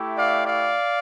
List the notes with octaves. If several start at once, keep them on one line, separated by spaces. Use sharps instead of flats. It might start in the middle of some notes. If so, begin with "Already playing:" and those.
Already playing: A3 E4 G4
D5 F5
D5 F5